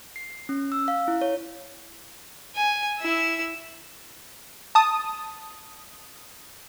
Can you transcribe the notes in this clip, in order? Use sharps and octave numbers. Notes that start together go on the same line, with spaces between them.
C7
C#4
E6
F5
E4
C#5
G#5
E4 E6
A5 D#6